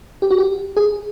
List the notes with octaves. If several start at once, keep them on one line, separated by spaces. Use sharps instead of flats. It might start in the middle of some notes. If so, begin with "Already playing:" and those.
G4
F#4
G4
G#4